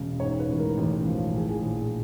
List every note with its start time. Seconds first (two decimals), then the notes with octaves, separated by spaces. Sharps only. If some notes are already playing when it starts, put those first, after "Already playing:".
Already playing: E1 C#3
0.20 G#2 C#5
0.39 B4
0.48 A1
0.58 A#4
0.77 A1
1.06 F3
1.34 A2 G#4
1.48 G#4
1.62 A#1